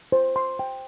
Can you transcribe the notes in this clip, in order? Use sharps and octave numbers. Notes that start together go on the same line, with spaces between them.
C5
C6
G5